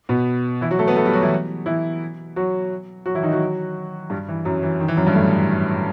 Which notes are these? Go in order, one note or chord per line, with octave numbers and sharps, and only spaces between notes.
B2 B3
E3 E4
F#3 F#4
A3 A4
B3 B4
A3 A4
G3 G4
F#3 F#4
E3 E4
E3 E4
F#3 F#4
F#3 F#4
E3 E4
D#3 D#4
F#3 F#4
G2 G3
E3
F#2 F#3
E3
D#3
E3
F#2 F#3
G2 G3
A2 A3